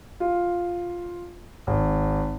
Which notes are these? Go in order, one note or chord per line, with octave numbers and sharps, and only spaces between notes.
F4
G#1